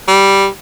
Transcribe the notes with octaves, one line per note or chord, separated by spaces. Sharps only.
G3